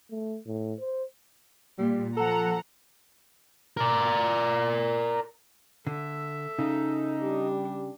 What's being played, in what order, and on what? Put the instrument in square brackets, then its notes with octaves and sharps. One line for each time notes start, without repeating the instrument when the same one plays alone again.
[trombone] A3
A2
C5
[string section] A#2 [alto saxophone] G3
[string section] F3 F#5 A#5 [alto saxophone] A4
[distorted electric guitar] A#4 D5
[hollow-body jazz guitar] D3 [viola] A4 E5
[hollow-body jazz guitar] C#3 [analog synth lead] D#4
[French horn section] G3 G4 [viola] D4